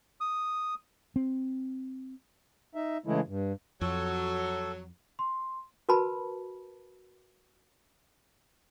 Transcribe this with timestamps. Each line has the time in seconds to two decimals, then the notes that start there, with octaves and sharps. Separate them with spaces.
0.21 D#6
1.16 C4
2.75 D#4 E5
3.06 C#3 E3 G#3 A3 E4
3.28 G2
3.81 F2 F#3 A4
5.19 C6
5.89 F#4 A#4 B4 A5 B5